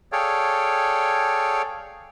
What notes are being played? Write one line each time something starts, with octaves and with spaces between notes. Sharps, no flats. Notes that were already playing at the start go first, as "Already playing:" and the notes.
G#4 A4 C#5 D5 F5 G5